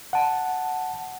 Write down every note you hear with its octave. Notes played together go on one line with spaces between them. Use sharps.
F#5 A5